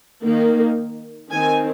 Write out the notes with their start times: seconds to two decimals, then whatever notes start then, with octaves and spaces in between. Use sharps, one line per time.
0.25 D#3 A#3
1.31 D#3 C4 G#5